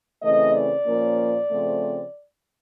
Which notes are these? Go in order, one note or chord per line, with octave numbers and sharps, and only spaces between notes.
C#3 E3 A3 C4 D#5
D5
A#2 F3 A#3 C#4
C#3 F3 A3 C4